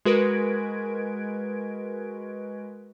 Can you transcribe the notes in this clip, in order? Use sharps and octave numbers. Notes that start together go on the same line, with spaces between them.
G#3 F#4 A#4 B4 G#6 D7